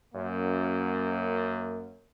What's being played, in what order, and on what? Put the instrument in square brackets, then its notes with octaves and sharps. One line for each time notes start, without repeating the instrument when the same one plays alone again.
[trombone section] F#2 A#3